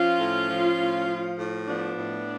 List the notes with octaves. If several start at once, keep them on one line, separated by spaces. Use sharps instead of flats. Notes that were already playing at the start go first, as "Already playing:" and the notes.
Already playing: F3 C#4 F4
A2
F3
A2
F3
A2
F3 B3 D4
A2